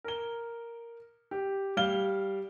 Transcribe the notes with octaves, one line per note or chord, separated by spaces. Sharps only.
A#4 G7
G4
G3 F5 F6 G7